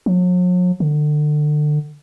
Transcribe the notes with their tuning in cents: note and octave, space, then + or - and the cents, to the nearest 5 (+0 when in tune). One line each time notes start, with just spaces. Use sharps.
F#3 -45
D3 +30